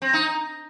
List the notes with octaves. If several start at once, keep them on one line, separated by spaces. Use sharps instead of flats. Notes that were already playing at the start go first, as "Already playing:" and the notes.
C4
D#4